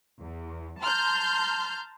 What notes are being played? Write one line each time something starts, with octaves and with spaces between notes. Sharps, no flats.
E2
A5 A#5 C6 F6 G6